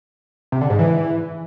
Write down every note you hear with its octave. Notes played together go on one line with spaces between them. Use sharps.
C3
D3
G#2
E3